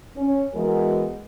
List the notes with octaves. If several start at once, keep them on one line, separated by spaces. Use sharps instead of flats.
C#4
E3 G#3 B3 F#4 A#4